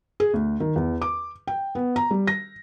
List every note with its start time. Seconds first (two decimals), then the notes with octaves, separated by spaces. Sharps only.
0.20 G#4
0.33 D2
0.60 D#3
0.76 E2
1.02 D6
1.48 G5
1.75 B3
1.96 A#5
2.11 G3
2.28 A#6